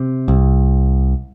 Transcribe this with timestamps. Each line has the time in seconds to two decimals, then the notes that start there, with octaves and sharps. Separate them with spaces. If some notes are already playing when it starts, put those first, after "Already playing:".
Already playing: C3
0.28 C2